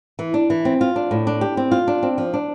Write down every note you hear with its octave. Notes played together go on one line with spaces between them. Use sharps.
E3
D4
E3
C4
F4
D4
A2
D4
G4
C4
F4
D4
C4
F3
D4